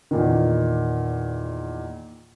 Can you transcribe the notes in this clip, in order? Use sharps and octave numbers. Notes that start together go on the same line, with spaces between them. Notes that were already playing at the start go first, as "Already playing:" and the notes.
E2 A#2 D#3